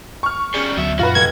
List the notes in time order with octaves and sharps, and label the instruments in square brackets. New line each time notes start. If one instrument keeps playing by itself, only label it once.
[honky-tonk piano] C#6 F6
[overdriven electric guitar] G3 C#4 [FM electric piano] G#4
[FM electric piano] D2 F#3 [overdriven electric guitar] B2 E5
[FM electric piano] F#2 A#2 F#3 [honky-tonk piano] F4 B4 [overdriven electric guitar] F#4
[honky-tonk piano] F1 [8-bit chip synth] G#6